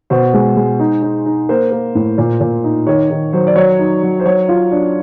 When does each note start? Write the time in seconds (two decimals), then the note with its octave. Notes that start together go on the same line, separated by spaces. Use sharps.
0.10 B2 C5
0.34 G#3
0.56 G#3
0.79 D#4
1.02 D#4
1.26 D#4
1.49 A#3 C5
1.72 A#3
1.95 A2
2.18 A#2
2.40 A#2
2.64 D#4
2.87 D#3 C#5
3.10 D#3
3.33 F#3 C5
3.47 D5
3.56 F#3 C#5
3.79 D#4
4.03 F#3
4.20 C5
4.25 F#3 C#5
4.49 F4
4.71 D4